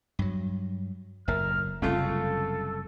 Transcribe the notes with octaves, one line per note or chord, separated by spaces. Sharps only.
G2 F#3
F#1 A2 A#4 E5 F6
F#1 C2 F#2 C#3 A3 F4 A4